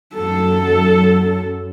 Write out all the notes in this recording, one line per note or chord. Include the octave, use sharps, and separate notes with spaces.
F#2 A4